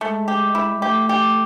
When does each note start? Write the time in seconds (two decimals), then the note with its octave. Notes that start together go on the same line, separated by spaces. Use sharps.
0.01 G#3 A3
0.28 G4
0.55 E4
0.73 G#3
0.82 A3 G4
1.09 G4